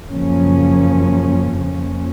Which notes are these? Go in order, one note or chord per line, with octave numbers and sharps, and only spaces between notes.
F#2 C#3 F3 A#3 C#4
F2 F3 A#3 C#4